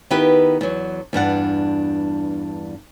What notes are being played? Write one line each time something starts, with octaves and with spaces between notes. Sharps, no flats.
D#3 B3 E4 G4 B4
E2 F#3
E2 G2 D4 F#5